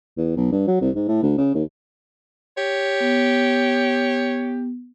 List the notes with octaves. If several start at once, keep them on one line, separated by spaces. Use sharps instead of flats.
E2
B1
G2
F#3
C2
G#2
A2
D2
C#3
D#2
G4 C#5
B3